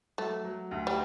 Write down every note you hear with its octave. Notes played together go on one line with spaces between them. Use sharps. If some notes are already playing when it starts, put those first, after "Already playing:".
F#3 A3
F#3
D2
G3